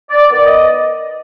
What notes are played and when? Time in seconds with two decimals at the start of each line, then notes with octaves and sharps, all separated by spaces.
0.10 D5
0.28 D#3 B3 D5
0.47 D#5